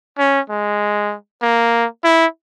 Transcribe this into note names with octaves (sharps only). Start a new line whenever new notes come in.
C#4
G#3
A#3
E4